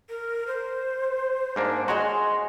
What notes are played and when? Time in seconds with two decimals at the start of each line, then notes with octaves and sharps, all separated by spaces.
0.09 A#4
0.47 C5
1.56 G#2 A#3 D4
1.88 G#3 F#4 C#5 C6